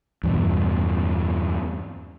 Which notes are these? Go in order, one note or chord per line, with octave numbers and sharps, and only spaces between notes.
E2 G2 B2